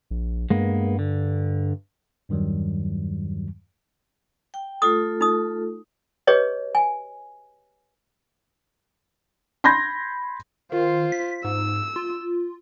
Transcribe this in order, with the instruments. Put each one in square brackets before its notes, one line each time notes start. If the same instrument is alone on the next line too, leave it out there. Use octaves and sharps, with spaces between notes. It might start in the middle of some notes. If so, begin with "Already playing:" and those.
[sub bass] A#1
[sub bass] G2 [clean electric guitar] G#3 A#3 B3
[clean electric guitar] D3
[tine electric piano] E2 G2 D#3 F#3 G3
[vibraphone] G5
[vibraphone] A3 F4 A4 [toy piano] D#6
[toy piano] D#4 D#6
G4 G#4 B4 C#5 D#5
G#5
[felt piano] B5 C6 G6 G#6 A#6
[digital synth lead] D#3 [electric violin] F4 C5
[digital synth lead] B6
[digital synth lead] G#2 [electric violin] E6
[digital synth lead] F4